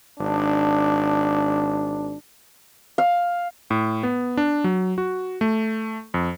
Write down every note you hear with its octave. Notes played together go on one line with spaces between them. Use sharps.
G#1 D4
F5
A2
B3
D4
F#3
F#4
A3
F2